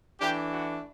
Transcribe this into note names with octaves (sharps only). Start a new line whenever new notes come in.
E3 A3 D4 G4
F#4